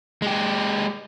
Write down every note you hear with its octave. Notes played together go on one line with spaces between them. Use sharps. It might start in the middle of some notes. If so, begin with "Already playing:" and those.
G#3 G4